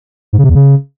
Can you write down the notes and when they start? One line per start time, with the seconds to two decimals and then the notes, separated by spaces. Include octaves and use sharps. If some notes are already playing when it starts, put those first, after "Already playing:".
0.33 G#2
0.38 C#3
0.44 C3
0.49 E2
0.55 C#3